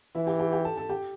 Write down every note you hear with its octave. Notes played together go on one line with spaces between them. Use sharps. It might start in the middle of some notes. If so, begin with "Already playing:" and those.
E3 E4 E5
G4 G5
G4 G5
G4 G5
A4 A5
A4 A5
G4 G5